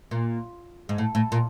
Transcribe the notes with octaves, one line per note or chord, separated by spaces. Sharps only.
A#2
G#2
A2
A2
A#2